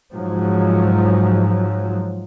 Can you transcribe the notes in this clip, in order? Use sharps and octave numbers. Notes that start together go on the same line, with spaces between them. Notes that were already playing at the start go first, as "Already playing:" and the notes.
G#2 F3 F#3